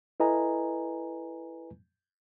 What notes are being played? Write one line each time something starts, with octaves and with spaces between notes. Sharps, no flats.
E4 A4 B4 D#5 G#5 A#5